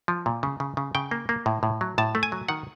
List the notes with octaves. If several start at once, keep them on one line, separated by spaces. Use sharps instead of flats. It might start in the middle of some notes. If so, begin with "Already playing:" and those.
F3
A#2
C#3
C#3
C#3
C#3 G5
A#3
A#3
A2
A2
F#3
A2 A5
A3
G#5
F#3
D#3 F#5